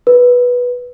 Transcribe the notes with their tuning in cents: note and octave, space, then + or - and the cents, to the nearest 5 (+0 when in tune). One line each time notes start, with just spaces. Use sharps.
B4 -10